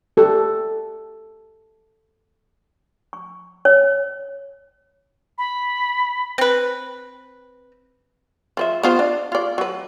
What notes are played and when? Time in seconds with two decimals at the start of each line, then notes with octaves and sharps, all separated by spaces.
0.17 G4 A4
3.13 C#6
3.65 C#5
5.38 B5
6.38 C4 B4
8.57 F3 B4 E5
8.83 B3 F4 C5
8.99 D4
9.32 F4 D5
9.58 F#3 B4